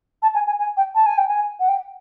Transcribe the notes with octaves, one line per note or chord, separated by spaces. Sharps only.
A5
G#5
G#5
G#5
G5
A5
G#5
G5
G#5
F#5
G5